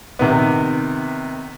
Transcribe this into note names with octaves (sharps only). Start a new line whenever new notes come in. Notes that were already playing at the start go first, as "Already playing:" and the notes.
C3 D#3 B3